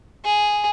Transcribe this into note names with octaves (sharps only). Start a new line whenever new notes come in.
G#4